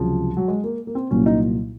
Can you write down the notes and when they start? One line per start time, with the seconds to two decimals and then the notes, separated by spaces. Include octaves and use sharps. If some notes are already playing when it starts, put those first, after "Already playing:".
Already playing: C#2 C3 F3 F#3 C#4 G#4
0.37 F#3
0.48 G#3
0.64 A#3
0.87 A#3
0.95 C4
1.11 C2 A#2 F#3 A#3 C#4
1.26 D#4